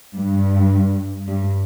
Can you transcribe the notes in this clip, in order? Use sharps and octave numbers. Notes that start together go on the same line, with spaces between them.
G2
G2